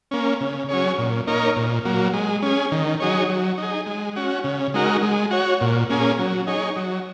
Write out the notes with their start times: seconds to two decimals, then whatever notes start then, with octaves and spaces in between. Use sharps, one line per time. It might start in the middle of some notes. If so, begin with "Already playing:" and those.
0.11 A#3 C#4
0.41 C#3
0.69 F#3 C#4 G#4 C#5
0.98 A#2
1.27 A#3 D#4 A#4 C#5
1.56 A#2
1.85 F#3 A#3
2.13 G#3
2.42 C#4 G#4
2.72 D#3
3.00 F#3 D#4 G#4 C#5
3.29 F#3
3.58 D#4 G#4
3.86 G#3
4.16 C#4 F#4
4.44 C#3
4.74 G#3 D#4 F#4 A#4
5.03 G#3
5.31 F#4 C#5
5.61 A#2
5.90 A#3 C#4 G#4
6.18 F#3
6.47 D#4 G#4 C#5
6.76 F#3